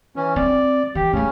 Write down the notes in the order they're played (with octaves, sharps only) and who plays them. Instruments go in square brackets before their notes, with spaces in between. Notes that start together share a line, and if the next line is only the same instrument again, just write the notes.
[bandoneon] E3 C#4
[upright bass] C4 [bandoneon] D5
[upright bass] E3 [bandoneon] G4
[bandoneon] C#3 C#4 [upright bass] A3 F4